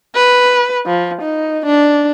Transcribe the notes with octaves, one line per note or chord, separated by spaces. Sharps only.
B4
F3
D#4
D4